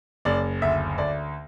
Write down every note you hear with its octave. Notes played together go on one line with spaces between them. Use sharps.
F#1 D5
D2 E5
D2 D5